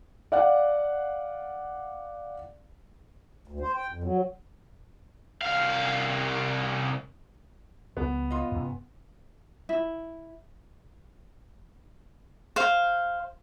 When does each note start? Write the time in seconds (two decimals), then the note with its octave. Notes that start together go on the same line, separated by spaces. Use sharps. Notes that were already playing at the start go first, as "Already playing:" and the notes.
0.32 D5 F5 F#5
3.48 D2
3.60 C5
3.75 G5
3.89 F2
4.04 F#3
5.41 C2 F5
7.97 C#2 F3 G3 B3
8.31 F4 D#5
8.52 G2 C3 C#4
9.69 E4
12.56 C5 F5